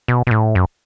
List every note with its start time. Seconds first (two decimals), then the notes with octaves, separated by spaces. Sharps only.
0.08 B2
0.27 B2
0.31 A2
0.55 F#2